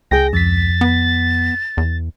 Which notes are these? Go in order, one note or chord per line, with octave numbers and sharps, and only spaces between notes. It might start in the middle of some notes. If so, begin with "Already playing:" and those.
C#2 G#4 G5 A#6
F2 A6 B6
B3
E2